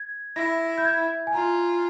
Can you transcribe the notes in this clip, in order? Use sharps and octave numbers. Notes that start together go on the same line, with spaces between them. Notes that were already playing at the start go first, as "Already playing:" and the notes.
Already playing: G#6
E4 A#6
G6
G#6
G#5
F4 A#5